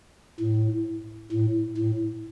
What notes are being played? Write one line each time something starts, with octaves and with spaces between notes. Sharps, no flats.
A2
A2
A2